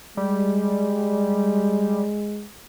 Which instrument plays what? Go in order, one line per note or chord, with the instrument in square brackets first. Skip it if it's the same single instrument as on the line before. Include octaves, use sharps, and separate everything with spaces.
[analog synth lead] G3 [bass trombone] G#3